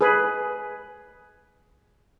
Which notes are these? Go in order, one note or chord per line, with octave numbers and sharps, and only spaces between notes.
G#4 B4